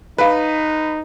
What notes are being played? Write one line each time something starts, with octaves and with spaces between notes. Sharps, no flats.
D#4 B4 F5 B5